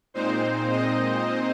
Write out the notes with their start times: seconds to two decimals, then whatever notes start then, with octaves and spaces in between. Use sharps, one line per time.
0.14 A#2 G#3 C4 D#4 C5
0.71 D#5